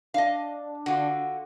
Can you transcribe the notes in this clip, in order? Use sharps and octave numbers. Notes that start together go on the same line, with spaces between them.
D4 D#5 F5
D3 F4 F#4